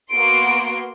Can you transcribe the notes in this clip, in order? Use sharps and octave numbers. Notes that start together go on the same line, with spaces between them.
A#3 B3 F#4 C6 D7